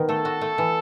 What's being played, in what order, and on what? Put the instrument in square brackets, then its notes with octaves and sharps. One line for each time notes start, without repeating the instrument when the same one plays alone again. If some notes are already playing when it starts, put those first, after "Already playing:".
Already playing: [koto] D#3 B3
[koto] A3 [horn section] A4
[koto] F#4
A3
E3